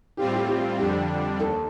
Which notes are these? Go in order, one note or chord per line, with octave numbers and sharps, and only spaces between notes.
A2 G3 C4 F4 G4
G4
G4
F2 D3 G3 D4 G4
D#2 A4